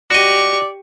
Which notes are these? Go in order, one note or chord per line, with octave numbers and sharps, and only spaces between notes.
F#4 G4 D5 D#5 C#6